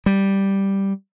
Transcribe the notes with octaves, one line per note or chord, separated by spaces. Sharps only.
G3